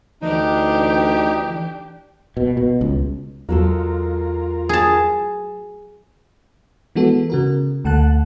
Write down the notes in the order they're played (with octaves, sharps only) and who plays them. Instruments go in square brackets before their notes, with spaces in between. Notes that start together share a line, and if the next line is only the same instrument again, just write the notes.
[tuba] D2 [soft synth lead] E3 [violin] D4 G4 [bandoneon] D#4
[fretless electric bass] B2
B2
C#2
[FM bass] E2 [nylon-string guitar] F#3 G#3 A4 [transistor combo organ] F4 A#4
[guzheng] G#4 A5
[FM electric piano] E3 G#3 B3 F#4 A4
C#3 F#4 A#4
D2 A3 F#5 A5 F#6